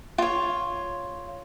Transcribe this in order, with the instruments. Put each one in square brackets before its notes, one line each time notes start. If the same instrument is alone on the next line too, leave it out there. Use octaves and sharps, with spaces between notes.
[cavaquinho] F4 C#5